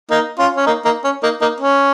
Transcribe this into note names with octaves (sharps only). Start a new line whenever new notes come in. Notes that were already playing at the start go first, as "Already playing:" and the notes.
A#3 D#4
C#4 F4
C#4
A#3 D#4
A#3 D#4
C#4
A#3 D#4
A#3 D#4
C#4